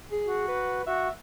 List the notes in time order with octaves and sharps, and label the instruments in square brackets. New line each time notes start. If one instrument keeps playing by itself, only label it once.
[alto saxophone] G#4
[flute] F#4
[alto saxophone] B4
[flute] F#4 [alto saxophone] E5